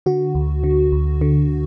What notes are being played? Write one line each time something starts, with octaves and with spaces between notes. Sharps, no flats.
D3 F#4
D2
D3
D2
D3